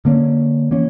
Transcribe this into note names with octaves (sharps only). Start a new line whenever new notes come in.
D3 A#3 C#4
E3 A#3 C#4